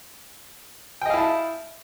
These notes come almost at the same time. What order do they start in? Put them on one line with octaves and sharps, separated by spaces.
G5 D#5 F5 E4 A5